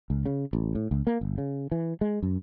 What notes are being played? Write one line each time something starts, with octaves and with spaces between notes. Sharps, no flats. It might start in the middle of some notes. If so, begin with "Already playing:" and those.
C#2
C#3
A1
A2
C#2
A#3
G1
C#3
E3
G#3
F#2